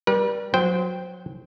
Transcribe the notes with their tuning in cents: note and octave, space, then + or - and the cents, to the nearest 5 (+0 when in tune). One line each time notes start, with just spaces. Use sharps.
G3 +0 B4 -45
F#3 -25 C5 -15 G5 +0